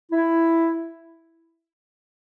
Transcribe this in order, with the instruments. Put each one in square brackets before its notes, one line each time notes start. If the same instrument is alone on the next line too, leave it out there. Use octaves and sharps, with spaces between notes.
[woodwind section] E4